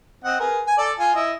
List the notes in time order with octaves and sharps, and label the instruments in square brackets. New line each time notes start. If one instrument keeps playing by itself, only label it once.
[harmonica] C4 D#5 F#5
G#4 A#4 B4
G#5
A4 D5
F4 G#5
E4 D#5